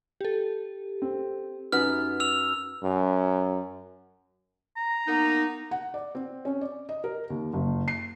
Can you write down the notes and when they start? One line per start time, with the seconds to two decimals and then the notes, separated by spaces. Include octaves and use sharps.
0.21 G4 A4
1.02 C4
1.72 F#2 D#4 B4 F#5 F6
2.20 E6 F7
2.83 F#2
4.76 A#5
5.08 A#3 B3 D#4
5.71 F#5
5.94 D5
6.15 C4
6.45 C#4
6.61 D5
6.89 D#5
7.04 A#4
7.30 D#2
7.53 F#1
7.88 C7